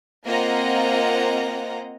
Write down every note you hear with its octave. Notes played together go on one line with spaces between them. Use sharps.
A#3 C4 F4 D#5 F#5 A#5